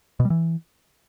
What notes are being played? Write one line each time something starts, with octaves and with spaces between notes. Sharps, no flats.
B2
G3
E3